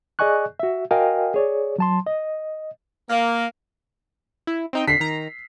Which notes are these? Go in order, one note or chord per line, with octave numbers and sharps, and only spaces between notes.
G#4 D5 D#5 G#5 C#6 F#6
F#4 E5
F#4 A#4 D#5 F5 G5 G#5
G#4 C#5 D5
F#3 A5 C6
D#5
A#3
E4
C4 D#4 G5
D3 B6 C7
D#3 A#5